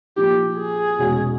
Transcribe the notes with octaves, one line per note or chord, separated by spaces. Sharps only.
A#2 F3 A#3 G4
G#4
E1 E2 B2 G#3 C#4